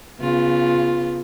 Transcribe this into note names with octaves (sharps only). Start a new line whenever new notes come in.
C#3 B3 F4